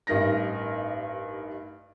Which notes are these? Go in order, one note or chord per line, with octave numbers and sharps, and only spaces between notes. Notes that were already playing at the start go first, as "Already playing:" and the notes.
A1 G2 D#4 A#4 A#6